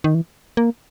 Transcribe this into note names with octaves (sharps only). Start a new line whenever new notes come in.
D#3
E3
A#3